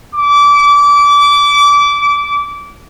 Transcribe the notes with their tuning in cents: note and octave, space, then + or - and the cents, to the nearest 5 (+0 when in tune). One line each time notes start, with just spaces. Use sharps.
D6 -25